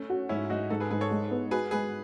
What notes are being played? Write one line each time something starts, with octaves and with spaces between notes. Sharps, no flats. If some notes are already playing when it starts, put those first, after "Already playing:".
Already playing: A3 C#4
F#4
G#2 C#4 E4
G#2 D#4 F#4
G#2 F#4 A4
G#4 B4
G#2 G#4 B4
A4 C#5
G#3
B3
F#4 G#4 B4
G#3 G#4 B4